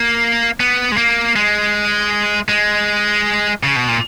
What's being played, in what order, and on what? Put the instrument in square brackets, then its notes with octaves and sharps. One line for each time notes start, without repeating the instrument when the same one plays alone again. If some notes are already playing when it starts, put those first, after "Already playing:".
Already playing: [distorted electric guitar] A#3
B3
G#3
A#3
G#3
G#3
C#3
B2
A#2